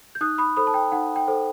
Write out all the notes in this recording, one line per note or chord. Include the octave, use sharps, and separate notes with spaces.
G6
D#4 D#6 F#6
B5 D#6
A4 C5 B5 D#6
A5
G5
D#4 F#5
G5
A4 C5